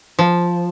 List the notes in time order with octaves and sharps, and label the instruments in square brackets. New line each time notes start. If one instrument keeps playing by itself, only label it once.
[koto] F3